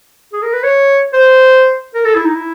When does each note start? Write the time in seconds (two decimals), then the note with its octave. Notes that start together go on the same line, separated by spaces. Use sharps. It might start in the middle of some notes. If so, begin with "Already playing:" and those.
0.33 G#4
0.43 A#4
0.53 B4
0.64 C#5
1.13 C5
1.95 A#4
2.05 A4
2.15 E4
2.25 D#4
2.35 E4